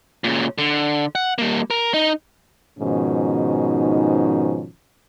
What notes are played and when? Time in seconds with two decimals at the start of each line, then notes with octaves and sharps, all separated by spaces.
0.24 A#2 C#3
0.58 D3
1.15 F#5
1.38 G3 A#3
1.70 A#4
1.94 D#4
2.79 G#2 B2 D#3 F3 C#4 D#4